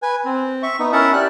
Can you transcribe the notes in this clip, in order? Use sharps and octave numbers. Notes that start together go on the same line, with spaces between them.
B4 G#5
C4
E5 C#6
B3 D#4
C#4 E4 A#4 E5 F#5 A5
G4 D5 F#6